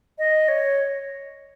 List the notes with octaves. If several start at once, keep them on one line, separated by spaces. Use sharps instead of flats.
D#5
C#5